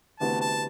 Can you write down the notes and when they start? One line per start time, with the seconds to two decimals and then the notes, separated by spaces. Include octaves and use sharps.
0.20 D2 C3 E3 B3 F#4 A5
0.41 A5